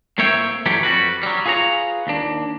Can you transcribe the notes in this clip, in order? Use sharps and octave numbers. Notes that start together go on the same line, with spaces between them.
A2 A#3 C4 C#5 E5 G5
E3 F#3 G3 A3 G4 C#5
F2 G3 F#4 B4
F#3 G3
F4 G#4 B4 C#5 A#5
D#2 D4